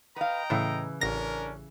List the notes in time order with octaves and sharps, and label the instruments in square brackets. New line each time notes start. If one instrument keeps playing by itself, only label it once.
[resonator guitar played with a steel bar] B4 F5 [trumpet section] D#5 G5 A#5
[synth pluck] A2 [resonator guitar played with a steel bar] C#3 E3
[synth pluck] A1 A#6 [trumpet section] C#4 D4 A#4